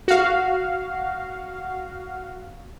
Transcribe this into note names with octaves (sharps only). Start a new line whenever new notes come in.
F#4 F5